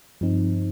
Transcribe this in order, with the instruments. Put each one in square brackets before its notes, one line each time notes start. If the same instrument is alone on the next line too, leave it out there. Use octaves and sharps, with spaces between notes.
[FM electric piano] G2 F3 C4 D#4